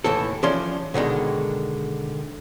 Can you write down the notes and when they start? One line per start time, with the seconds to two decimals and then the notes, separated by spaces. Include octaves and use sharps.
0.04 D#2 A2 E3 A4
0.43 E3 F3 C#4 D5 C6
0.94 B2 D3 D#3 G#3